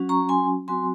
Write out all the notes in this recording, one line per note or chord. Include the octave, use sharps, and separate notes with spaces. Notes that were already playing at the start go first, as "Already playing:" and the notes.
Already playing: F#3 C#4 F#4
A#5 C#6
G#5 C6
F#3 C4 F#4 G#5 C6